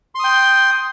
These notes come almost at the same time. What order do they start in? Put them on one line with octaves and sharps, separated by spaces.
C6 D#6 G5